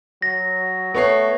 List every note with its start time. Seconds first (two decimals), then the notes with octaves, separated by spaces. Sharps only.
0.22 F#3 A#6
0.94 A3 B3 C#5 C7